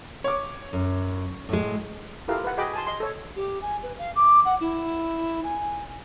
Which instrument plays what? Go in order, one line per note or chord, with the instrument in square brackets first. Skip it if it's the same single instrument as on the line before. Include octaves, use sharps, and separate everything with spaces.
[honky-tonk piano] C#5 D6
[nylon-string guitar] F#2
A2 G#3
[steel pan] E4 F4 G4 A4 A#4 F5
B4 F#5
F#4 G#4 D#5 G5 B5 D6
G#5 A5 C6
D#5 C6
A4 C#5
[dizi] G4
G#5
B4
F5
D6
F#5
E4
G#5